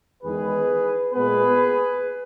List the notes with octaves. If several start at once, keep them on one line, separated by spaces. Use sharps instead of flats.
E2 D#3 G#3 G#4 B4
A#2 G#3 B3 G#4 B4